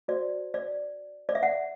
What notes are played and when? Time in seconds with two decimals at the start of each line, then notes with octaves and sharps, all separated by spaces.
0.08 F#4 C5 D5
0.54 D5
1.29 D5
1.35 E5
1.43 F#5